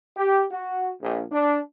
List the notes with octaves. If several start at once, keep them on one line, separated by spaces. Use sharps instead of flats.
G4
F#4
A#1
D4